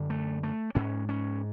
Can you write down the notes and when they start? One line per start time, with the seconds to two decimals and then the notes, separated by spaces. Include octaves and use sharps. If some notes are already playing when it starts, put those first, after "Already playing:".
Already playing: F#2 D3
0.10 A3
0.43 A3
0.75 G#2 C#4
1.09 C#4